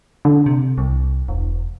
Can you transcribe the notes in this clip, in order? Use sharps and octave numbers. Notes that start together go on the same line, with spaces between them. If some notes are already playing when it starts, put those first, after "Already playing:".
D3
C3
C2
E1